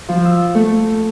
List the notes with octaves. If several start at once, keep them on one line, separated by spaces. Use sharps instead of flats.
F3
E6
A3